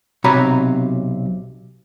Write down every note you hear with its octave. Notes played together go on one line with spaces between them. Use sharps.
B1 C3 F#4 C#5 A#5 B5